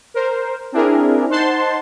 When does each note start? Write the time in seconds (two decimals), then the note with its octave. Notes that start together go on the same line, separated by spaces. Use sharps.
0.14 A#4 C5
0.72 C4 D4 E4 G#4 A#4
1.29 D#4 C5 F#5 A5 C6